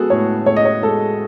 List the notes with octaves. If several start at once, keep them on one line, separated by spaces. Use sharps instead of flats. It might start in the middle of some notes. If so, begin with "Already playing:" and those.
Already playing: G#3 B3 F#4 G#4 A4
A2 C#5
A2 C#5
D#5
C#5
G#3 A4